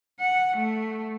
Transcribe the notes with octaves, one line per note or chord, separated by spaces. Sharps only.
F#5
A3